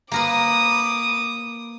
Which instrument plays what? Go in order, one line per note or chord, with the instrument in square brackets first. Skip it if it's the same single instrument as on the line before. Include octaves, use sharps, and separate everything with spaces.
[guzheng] A#3 A#4 B4 [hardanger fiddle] D6 D#6